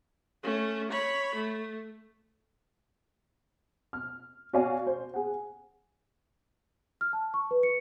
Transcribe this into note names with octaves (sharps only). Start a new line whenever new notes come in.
A3 C#4
C#5 B5
A3
F6
F#4 C#5 D5 F5 G#5
C5
G#4 F#5
F6
A5
C#6
B4
C#7